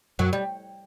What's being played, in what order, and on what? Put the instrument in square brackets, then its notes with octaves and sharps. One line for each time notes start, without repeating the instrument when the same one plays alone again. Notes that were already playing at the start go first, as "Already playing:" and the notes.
[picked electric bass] F#2 [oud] F#3
[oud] G3